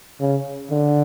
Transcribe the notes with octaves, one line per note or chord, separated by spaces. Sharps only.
C#3
D3